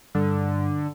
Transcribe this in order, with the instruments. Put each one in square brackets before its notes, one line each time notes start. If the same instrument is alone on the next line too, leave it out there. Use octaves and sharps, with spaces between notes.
[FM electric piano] G2 [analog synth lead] D3